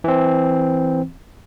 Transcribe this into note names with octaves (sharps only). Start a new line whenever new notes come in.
E3 C4